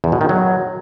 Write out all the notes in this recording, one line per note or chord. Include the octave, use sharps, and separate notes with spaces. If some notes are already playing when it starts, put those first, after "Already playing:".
E2
B2
D#3
F#3